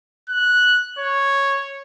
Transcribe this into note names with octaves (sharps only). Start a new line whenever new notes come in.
F#6
C#5